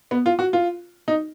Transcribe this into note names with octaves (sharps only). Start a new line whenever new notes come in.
B3
F4
F#4
F4
D#4